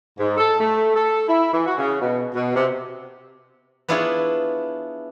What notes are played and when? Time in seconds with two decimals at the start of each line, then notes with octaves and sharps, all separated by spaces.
0.19 G#2
0.37 A4
0.60 A3
0.96 A4
1.28 E4
1.52 E3
1.66 F#4
1.78 C#3
2.01 B2
2.34 B2
2.55 C3
3.89 B3 D4 E4 F4 G#4 C#5